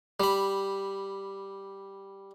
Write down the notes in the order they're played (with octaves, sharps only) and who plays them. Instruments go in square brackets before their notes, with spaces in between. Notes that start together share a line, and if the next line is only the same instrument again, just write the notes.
[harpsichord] G3 B5